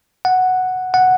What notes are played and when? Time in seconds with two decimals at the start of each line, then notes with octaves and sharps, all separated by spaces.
0.25 F#5
0.94 F#5